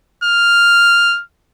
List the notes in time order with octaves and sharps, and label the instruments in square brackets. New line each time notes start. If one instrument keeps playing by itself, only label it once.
[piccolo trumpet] F6